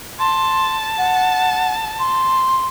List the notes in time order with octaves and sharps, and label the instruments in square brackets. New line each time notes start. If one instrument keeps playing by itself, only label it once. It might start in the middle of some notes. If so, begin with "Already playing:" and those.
[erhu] A5 [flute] C6
[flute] F#5
C6